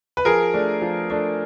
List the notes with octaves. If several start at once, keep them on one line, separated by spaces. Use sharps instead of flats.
B4
F3 G#4 A#4
A3 D4
F3
A3 D4